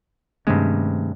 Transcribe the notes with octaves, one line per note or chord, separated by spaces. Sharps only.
G2 C3 D#3 G#3 A3 C#4